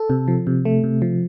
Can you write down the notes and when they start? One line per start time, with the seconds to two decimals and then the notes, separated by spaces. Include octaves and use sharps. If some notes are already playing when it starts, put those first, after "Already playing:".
Already playing: A4
0.10 C3
0.28 F3
0.47 C3
0.65 A3
0.84 C3
1.02 F3